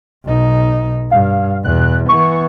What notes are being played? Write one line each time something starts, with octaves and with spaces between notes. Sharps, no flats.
B1 D#4
G2 F5
E2 B2 F#6
E3 B3 C#6